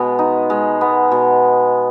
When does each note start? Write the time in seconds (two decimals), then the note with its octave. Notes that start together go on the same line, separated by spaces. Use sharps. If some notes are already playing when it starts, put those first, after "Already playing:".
Already playing: B2 G#3 B3
0.19 D#4
0.50 G#3
0.81 B3
1.12 B2